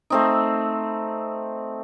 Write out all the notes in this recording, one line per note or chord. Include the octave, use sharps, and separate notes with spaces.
A3 C4 D#4